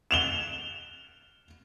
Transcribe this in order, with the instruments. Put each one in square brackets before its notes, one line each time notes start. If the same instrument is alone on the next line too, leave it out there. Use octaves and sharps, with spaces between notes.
[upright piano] E7 F7 G7